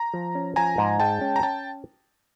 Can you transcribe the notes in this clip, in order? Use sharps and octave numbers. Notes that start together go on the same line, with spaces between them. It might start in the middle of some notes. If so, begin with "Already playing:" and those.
Already playing: A#5
F3
C#4
F3 G#5 A#5
G#2
G#3 G5 A5
C#4
A#5
C#4 G5 A5